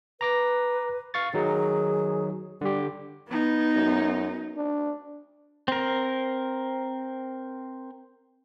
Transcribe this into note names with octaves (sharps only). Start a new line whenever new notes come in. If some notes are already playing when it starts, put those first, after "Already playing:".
B4 A#5 D6 A#6
F5 C#6 A6
D#3 F#3 D#4 G#4
D3 G3 G4
B3 D#4
F#2
D4
C4 A#4